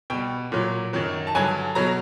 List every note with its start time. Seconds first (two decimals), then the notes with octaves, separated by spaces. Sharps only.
0.10 B2 G3 G5
0.52 A#2 F#3
0.93 F#2 D#3 F#3
1.27 A5
1.34 G2 D3 F#3 G#5
1.75 B2 F#3 A#5